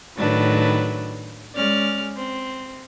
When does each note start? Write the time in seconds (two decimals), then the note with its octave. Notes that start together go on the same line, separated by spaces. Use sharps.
0.17 A2 D#3 F#3 D4 B4
1.55 G#3 C#4 D5 F6
2.16 C4